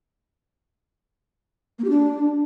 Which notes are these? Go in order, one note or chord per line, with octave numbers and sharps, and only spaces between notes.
A#3
G4
D4